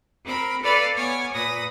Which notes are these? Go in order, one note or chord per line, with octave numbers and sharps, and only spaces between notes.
C4 A#4 B5
A4 B4 D5 F5 B5
B3 C#5 G#5 D6 F6
A#2 B4 D#6 A#6